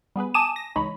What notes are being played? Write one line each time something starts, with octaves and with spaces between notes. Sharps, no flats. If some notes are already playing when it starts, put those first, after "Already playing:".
G3 B3 G#4 B4
G#5 A5 D6 D#6 D#7 E7
A#6
C#2 E3 G#3 D#4 C#5 B5